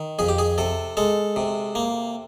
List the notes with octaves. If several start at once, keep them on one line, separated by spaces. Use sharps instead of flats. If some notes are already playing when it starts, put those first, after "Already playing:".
Already playing: D#3
F2 G#4
G4
G#4
C3 A4
G#3 A4
C3
A#3